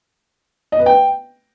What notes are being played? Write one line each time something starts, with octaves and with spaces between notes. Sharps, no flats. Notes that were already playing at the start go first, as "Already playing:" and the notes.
D#5
B4
G5